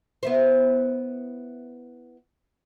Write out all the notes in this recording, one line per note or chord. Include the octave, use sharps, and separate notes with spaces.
B3 E4 C5